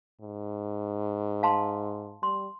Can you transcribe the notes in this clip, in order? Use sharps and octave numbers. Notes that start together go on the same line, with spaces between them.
G#2
F5 A5 C6
G3 C6